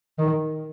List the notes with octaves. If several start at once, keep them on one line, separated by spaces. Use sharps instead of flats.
D#3